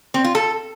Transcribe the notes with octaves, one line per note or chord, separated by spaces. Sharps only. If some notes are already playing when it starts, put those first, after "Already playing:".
C4
F4
A4